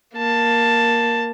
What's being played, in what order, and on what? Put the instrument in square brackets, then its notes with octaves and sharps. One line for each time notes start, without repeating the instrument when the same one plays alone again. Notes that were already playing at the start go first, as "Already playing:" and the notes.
[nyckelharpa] A#3 A5